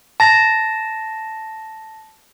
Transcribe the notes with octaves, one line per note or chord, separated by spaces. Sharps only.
A5 A#6